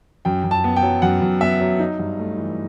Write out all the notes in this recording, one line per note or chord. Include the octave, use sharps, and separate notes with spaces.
F#2 G5
F#2
A5
B3
G5
F#3
F#2 F#5
F#2
B3 E5
F#3
D#4
G2
A3
E3